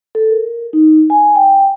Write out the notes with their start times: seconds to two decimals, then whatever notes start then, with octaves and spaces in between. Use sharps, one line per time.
0.15 A4
0.31 A#4
0.73 D#4
1.10 G#5
1.36 G5